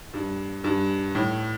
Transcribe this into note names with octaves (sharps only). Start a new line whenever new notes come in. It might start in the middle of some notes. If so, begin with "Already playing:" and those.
G2
G2
A2